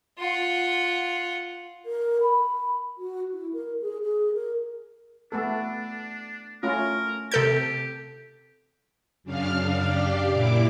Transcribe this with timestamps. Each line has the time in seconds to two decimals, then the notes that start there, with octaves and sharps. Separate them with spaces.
0.19 F4 F#5
1.86 A#4
2.21 B5
2.98 F#4
3.33 E4
3.53 A#4
3.82 G#4
4.03 G#4
4.34 A#4
5.32 A3 B3 D4 A4
6.63 A3 C#4 F4 A#4
7.32 C3 G4 A4 G6
9.24 F#2 C#3 D4 F5 F6
9.84 D4 G4 D5 F5
10.32 A#2 E4 D6